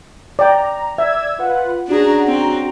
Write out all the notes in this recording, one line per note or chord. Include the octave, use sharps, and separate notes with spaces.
D5 G5 A#5
D5 E5 E6 G#6
F4 B4 F#5
C#4 D4 F#4 G#4 A#5
C4